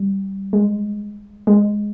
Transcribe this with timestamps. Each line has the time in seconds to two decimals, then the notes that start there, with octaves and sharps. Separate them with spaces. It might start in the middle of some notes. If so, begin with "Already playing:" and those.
Already playing: G3
0.53 G#3
1.47 G#3